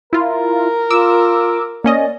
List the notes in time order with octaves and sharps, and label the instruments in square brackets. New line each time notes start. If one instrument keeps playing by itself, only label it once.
[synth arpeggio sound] E4 F4 [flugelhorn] A#4
[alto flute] F4 [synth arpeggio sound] D6 E6
[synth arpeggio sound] A#3 C#4 D#5 [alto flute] D5